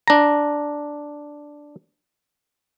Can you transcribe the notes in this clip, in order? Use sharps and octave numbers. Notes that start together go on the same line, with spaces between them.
D4 A#5